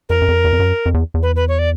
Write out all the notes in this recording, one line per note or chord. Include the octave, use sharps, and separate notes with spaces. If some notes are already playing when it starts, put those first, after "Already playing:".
F2 A#4
F#2
F2
E2
F2
F#2
F2
E2
E2
B4
B4
C#5
D5